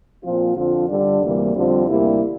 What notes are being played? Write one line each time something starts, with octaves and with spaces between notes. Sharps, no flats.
A#2 F3 C4 F4
F2 D3 F3 C4 F4
G2 D3 G3 D4
D2 C3 E3 G3 A#3
F2 D3 G3 C4 F4
D2 C3 G3 A#3 E4